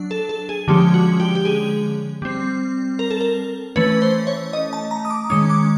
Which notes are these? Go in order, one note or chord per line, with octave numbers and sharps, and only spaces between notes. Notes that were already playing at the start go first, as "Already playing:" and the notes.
Already playing: F#3 D4
A4
A4
G#4
D3 F3 G#3 C#4 G4
F#4
G4
G4
G#4
G3 C4
A#4
A4
A#4
E3 A3 C#4 B4
C5
C#5
D#5
A5
A#5
D#6
D6
D#3 G#3 C#4 D#6
D6